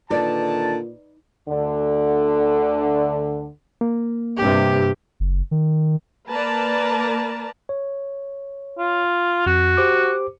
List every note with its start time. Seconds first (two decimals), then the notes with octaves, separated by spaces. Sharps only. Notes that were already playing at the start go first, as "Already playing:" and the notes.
0.10 A#2 D3 D#3 D#4 B4 D5 A5
1.48 D2 D3
3.81 A#3
4.37 G2 C3 G4
5.20 F#1
5.51 D#3
6.32 A#3 A#4 B4 D5 A5 A#5
7.69 C#5
8.78 F4
9.46 F2 F#4
9.77 G4 C5 D6